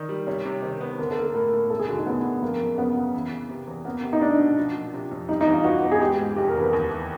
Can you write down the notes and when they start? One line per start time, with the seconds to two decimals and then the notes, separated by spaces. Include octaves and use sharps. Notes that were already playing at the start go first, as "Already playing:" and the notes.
Already playing: D#3 D5
0.09 G3
0.27 C3 C#5
0.45 C3
0.62 D#3 C5
0.81 B3
0.98 D3 A#4
1.11 A4
1.17 A#3
1.23 A4
1.35 A2 A#4
1.53 A2
1.70 E1 A4
1.79 G#4
1.89 D3 F#4
1.97 D#4
2.06 A2 B3
2.24 A2
2.42 F2 A#3
2.61 F#1
2.78 C#3 B3
2.96 C#3
3.14 E3
3.31 C#3
3.49 C3
3.67 E2
3.85 A#3 B3
4.03 C3
4.13 D#4
4.21 A3 D4
4.39 B2
4.57 F3
4.75 A#2
4.93 C3
5.11 F2
5.28 G3 D#4
5.41 D#4
5.47 E2
5.53 F4
5.64 B3 F#4
5.82 B3
5.92 G#4
6.00 G#3 G4
6.19 G#2
6.36 F1 G4
6.48 A#4
6.55 E2
6.61 B4
6.73 D#2
6.90 E3